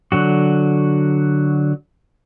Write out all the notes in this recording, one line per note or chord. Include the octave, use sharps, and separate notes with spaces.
D3 F#3 F#4